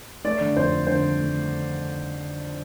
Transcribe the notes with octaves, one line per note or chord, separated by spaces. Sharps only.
A3 D5
D3
F2 C5
A3
D3 C5
A3
A3